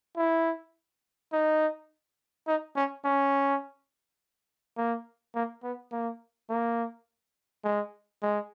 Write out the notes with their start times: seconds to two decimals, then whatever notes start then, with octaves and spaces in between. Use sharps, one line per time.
0.17 E4
1.33 D#4
2.47 D#4
2.76 C#4
3.04 C#4
4.77 A#3
5.35 A#3
5.63 B3
5.92 A#3
6.49 A#3
7.64 G#3
8.22 G#3